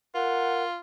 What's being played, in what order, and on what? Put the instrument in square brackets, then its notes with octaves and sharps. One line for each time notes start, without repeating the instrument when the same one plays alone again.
[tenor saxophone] F4 [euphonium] A#4 [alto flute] F#5